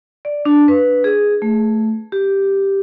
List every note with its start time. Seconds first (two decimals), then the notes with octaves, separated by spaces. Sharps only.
0.25 D5
0.45 D4
0.68 B4
1.04 G#4
1.42 A3
2.12 G4